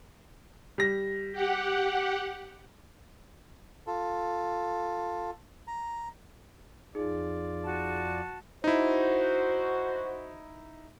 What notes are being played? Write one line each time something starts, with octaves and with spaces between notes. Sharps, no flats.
G3 A#6
G4 F#5
F4 A4
A#5
F2 D#4 F4 G#4 D5
F#4 A5
D#4 E4 F#4 C5